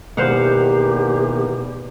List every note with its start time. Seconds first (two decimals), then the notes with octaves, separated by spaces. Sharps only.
0.17 E2 B2 D#3 A#3 G4 C5 F5 F#5